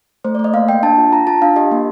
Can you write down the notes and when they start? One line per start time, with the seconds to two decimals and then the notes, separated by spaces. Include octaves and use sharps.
0.24 A3 C5
0.35 D5
0.39 A3
0.44 D#5
0.53 A#3 F5
0.68 A#3 G5
0.83 D4 A5
0.98 F4
1.13 F4 A#5
1.27 F4 A5
1.42 D4 F5
1.56 G4 D#5
1.71 A#3